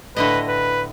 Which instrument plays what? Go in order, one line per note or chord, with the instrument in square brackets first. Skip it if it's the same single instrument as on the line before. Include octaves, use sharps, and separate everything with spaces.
[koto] A2 D3 D#5 [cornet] B4
[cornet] B4